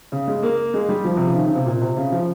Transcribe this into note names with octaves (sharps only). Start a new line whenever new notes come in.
C#3
G#3
A#3
G#3
G3
F3
C3
C#3
D#3
C#3
C3
A#2
C3
C#3
F3